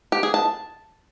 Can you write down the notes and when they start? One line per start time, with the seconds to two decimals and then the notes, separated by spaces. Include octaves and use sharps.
0.12 G4
0.23 G#4
0.34 A5